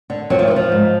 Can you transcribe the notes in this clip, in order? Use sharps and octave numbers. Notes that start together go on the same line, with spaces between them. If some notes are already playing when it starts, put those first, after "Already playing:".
D3
F2 F#3
F3
E3
D3
F3
G#2